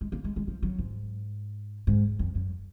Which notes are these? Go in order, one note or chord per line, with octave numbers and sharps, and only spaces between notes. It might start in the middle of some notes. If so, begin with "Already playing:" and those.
G#3
A#3
G#3
G#3
F3
F#3
G#2
G#2
F2
F#2